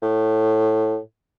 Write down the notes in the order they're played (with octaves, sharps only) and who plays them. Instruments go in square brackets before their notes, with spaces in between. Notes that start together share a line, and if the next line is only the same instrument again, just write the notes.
[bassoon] A2